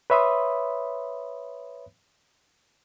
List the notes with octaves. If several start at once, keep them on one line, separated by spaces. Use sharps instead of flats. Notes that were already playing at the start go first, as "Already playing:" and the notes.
B4 C#5 E5 B5 C6 D#6